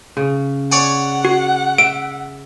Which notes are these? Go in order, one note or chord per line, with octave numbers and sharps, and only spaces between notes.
C#3
C#5 D5 F#5 G#5
F#4
E5 D7